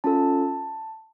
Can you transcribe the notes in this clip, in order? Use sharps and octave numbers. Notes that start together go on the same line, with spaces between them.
C#4 F4 A4 A5